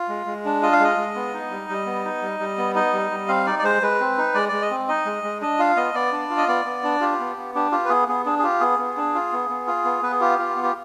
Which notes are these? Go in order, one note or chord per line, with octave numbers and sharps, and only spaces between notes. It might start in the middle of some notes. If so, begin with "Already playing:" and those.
Already playing: F4
G#3
G#3
D4
F4 D#5
F5
G#3 D#5
G#3
B3
D#4
G3
G3
B3
D#4
G3
G3
B3
D#4 D#5
G3
G3
C4 F5
D#4 D5
D5
G#3 C5
G#3 B4
C4
D#4
G#3 D5
G#3 D5
D#5
C4
D#4 D#5
G#3
G#3
D4 D#5
F4 F5
B3 D#5
B3 D5
D4
F4
D#5
B3 D5
B3
D4
F4 G4
B3
B3
D4 G4
F4 G4
B4
B3 G#4
B3 G#4
D4 G#4
G#4
F4 G4
B3 G#4
B3
D4
F4
B3
B3
F4
B3
B3 B4
G#4
F4 G4
F4
B3
G4